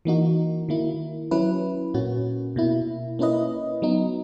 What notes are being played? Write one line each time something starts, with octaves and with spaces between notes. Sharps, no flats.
E3 A#3 D#4 F#4
D#3 A#3 E4
F#3 C#4 E4 B4
A#2 A#3 C#4 F#4
B2 A#3 E4
A#3 C#4 E4 B4 D#5
F#3 B3 D#4